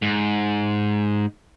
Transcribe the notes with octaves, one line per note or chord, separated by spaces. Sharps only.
G#2